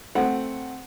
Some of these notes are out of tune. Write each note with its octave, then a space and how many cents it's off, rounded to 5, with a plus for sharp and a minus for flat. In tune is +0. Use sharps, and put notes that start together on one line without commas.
A3 +0 C4 +0 F#5 +0